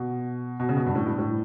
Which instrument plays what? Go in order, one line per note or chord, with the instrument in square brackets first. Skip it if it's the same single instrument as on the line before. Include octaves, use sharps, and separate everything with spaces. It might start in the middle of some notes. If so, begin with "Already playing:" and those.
Already playing: [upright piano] B2
B2
C#3
B2
G2
A2
G2
A2